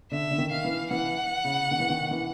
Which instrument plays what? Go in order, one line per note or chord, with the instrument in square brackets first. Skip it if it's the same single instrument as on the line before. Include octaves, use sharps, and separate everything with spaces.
[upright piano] D3 [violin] E5
[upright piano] D3
D#3
[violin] F5
[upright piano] E3
[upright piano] E3 [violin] F#5
[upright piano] C#3
D#3
E3
D#3
E3